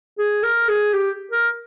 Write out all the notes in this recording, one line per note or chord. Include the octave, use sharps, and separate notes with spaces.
G#4
A#4
G#4
G4
A#4